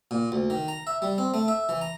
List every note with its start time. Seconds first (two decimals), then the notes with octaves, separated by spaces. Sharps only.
0.11 A#2
0.32 D2
0.50 D#3
0.68 A#5
0.87 E5
1.02 G3
1.18 C4
1.34 A3
1.48 E5
1.69 E3
1.81 A#5